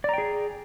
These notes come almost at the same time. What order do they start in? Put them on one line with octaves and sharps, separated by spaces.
D5 A#5 G5 G#4